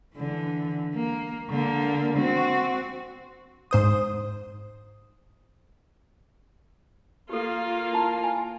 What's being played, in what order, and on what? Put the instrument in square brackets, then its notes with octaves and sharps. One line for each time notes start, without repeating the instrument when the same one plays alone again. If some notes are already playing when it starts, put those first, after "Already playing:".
[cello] D3 E3
A#3
D3 A#3
C4 F#4
[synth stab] G#2 C5 D#6
[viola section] A#3 F4 [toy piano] G4 A4
[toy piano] E4 A5 B5
G#5